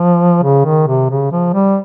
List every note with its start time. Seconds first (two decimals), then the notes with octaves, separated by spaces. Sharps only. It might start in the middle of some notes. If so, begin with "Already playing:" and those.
Already playing: F3
0.44 C#3
0.65 D#3
0.87 C3
1.10 C#3
1.32 F3
1.54 G3